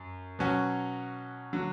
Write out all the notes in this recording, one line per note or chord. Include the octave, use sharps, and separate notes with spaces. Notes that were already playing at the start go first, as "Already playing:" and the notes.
Already playing: F#2
B2 F#3 C#4 F#4
D3 F#3